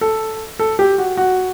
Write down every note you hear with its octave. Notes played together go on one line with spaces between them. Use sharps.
A4
A4
G4
F#4
F#4